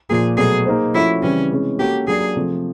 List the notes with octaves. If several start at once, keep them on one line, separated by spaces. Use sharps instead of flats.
A#2 F3 A#3 G#4
B2 F#3 A3 G#4
A#3 D#4 G#4 C5
F3 A3 C#4 E4 F#4
C#3 E3 G3 C4 C#4
C3 E3 G#3 C#4
A#3 C#4 F#4 G4 A4
F#3 A#3 D4 G#4
C3 F3 A3